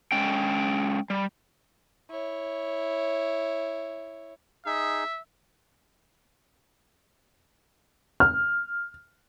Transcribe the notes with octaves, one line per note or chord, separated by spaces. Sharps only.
G#3 C#4 G5
G3
E4 C#5
D#4 G#4 E5
F6